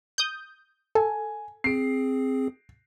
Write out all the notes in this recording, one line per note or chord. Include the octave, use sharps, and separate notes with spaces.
D#6 G6
A4 G#5
C4 G#4 C7 D7